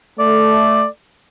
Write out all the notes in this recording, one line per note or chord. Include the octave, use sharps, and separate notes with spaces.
A3 D5